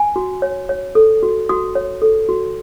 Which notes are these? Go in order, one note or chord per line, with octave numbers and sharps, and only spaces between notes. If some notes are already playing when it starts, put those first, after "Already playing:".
Already playing: G#5
F#4
C#5
C#5
A4
F#4
F#4 D#6
C#5
A4
F#4